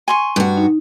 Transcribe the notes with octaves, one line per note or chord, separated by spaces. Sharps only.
G#5 C6 C#6
G2 F#4
D#4